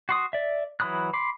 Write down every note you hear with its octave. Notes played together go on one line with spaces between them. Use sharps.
F#4 C6 D#6
D5 E5
E3 F#3 B5 D#6 F#6
B5 C6 D6